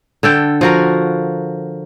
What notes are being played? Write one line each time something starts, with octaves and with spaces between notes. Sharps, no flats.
D3 A4 G5
F3 F#4 A#4